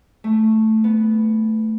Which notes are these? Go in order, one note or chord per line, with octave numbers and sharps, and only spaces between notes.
A3
B3